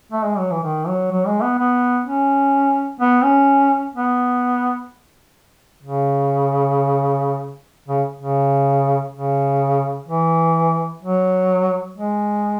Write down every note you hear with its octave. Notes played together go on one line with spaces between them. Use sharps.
A3
G#3
F#3
E3
D#3
F#3
F#3
G#3
B3
B3
C#4
B3
C#4
B3
C#3
C#3
C#3
C#3
E3
F#3
G#3